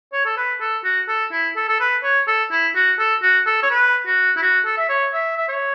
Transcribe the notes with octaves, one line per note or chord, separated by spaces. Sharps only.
C#5
A4
B4
A4
F#4
A4
E4
A4
A4
B4
C#5
A4
E4
F#4
A4
F#4
A4
C#5
B4
F#4
E4
F#4
A4
E5
C#5
E5
E5
C#5